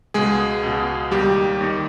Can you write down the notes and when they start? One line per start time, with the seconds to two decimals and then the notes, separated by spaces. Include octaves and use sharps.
0.14 C#2 B2 G#3 G#4
0.63 C#2 B2
1.11 D#2 D#3 G3 G4
1.61 D#2 D#3